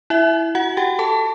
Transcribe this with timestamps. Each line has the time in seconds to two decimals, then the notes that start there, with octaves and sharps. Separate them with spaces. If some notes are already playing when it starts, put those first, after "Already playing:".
0.10 E4 E5
0.55 F#4 F#5
0.77 G4 G5
0.99 A4 A5